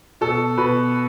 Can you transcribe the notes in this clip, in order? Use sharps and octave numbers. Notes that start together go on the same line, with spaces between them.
B2 A4
B2 B4